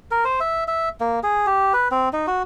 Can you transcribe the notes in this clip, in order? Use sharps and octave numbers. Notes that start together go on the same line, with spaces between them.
A#4
C5
E5
E5
A#3
G#4
G4
B4
C4
D#4
F#4